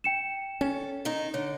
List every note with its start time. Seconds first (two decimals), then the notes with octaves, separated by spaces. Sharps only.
0.04 G5 C#7 E7
0.61 C#4 A4
1.05 D#3 D#4
1.34 D3 C#5